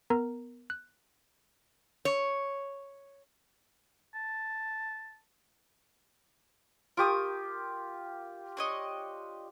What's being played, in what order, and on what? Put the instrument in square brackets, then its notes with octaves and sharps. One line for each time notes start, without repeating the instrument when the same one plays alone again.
[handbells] B3 A#4 A#5
F#6
[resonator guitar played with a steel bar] C#5
[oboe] A5
[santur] F4 G4 [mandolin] A#4 C#6 D#6
[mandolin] D4 C#5 D#5